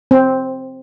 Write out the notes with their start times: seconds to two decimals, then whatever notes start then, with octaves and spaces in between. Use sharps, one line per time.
0.11 C4